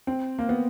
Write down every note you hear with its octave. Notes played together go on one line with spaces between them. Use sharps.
C4
A#3
B3